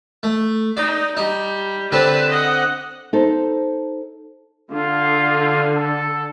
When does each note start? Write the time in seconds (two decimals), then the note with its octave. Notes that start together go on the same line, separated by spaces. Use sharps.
0.23 A3
0.77 D#4 D5
1.17 G3 D#4
1.92 D3 C4 D4 B4 A5
2.29 D#5 F#5
3.13 D#4 A4 C5
4.72 D3 F4
5.77 A4